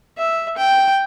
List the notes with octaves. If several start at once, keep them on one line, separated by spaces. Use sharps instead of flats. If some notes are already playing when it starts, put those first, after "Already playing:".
E5
G5